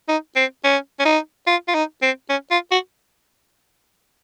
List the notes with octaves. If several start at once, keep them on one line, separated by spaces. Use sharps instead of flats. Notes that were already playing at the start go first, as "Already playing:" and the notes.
D#4
C4
C#4
C#4
D#4
F4
F4
D#4
C4
C#4
F4
F#4